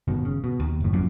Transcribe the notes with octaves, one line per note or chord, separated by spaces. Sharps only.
G1 B2 D#3
C#3
B2
D#2
F#1 A2
A#1 F#2 A#2